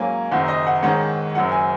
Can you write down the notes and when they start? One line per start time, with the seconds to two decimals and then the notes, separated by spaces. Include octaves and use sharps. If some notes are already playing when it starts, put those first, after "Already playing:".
Already playing: G#2 F#3 A#3 C#4 G#5
0.31 F#1 F#2 D#3 F#5
0.48 D#5
0.67 F#5
0.83 G#2 D#3 G#3 C#4 F#5
1.35 F#1 F#2 F#3 F#5
1.52 G#5